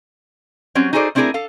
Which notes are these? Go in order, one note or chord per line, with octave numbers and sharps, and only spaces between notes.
F#3 G3 C4 C#4
D#4 F#4 G#4 A4 C5 D5
A3 C4 D4 E4 G#4 A#4
A4 F5